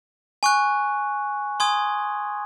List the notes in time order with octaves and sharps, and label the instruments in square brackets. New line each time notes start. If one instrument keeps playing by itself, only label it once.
[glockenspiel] G#5 C#6 F#6
G#5 C6 D#6 G#6